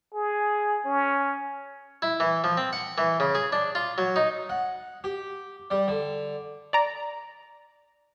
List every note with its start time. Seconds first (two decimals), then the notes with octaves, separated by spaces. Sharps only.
0.14 G#4
0.85 C#4
2.02 E4
2.20 E3
2.44 F3
2.57 C4
2.73 F#5
2.98 E3
3.20 C#3
3.35 G#4
3.52 D4
3.75 F4
3.98 F#3
4.16 D#4
4.49 F#5
5.04 G4
5.71 G3
5.88 D3
6.73 D5 A#5